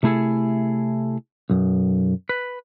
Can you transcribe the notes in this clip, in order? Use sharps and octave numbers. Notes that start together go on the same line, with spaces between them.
C3 A3 E4 G#4 A4
B1 F#2
B4